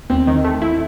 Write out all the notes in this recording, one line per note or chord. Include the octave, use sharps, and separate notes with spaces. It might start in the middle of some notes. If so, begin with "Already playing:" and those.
D#2 C4
D#3
A3
E4